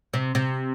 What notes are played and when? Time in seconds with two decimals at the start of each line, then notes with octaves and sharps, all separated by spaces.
0.13 C3
0.35 C3